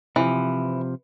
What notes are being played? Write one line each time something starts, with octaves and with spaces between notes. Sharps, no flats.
C3 E3 F3